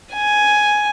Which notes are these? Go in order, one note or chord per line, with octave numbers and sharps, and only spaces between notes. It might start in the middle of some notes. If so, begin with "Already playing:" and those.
G#5